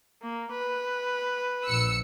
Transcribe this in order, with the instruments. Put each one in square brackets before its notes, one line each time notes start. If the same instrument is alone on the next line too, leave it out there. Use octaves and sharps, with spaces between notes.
[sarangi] A#3
B4
[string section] A#1 E6 C#7